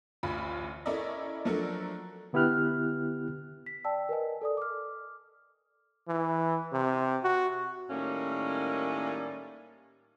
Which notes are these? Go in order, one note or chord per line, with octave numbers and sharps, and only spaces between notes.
A1 D2 F4 B5
C#4 E4 A4 A#4 D5 D#5
F3 F#3 A3 D4 A4 A#4
D3 B3 E4 G4 F6 F#6
B6
D5 G5 A5 E6
A#4 B4 D#5 G#5
A4 D5 D#6
D6 F6
E3
C3
F#4
A2 D#3 G3 A#3 C#4